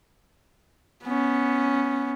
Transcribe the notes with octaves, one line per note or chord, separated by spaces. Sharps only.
B3 C#4